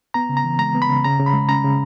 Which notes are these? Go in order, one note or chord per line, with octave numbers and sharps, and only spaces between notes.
B3 A#5
C#3
A#5
E3
G#3 A#5
B3
B5
C#3
C#3 A#5
C#3
B5
G#3
C#4 A#5
C#3